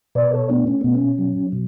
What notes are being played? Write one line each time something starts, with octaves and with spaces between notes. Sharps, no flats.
B2 B4 D5
A4 C#5
A3 B3 D4
C#4
B2 B3
C#4
F#3
B2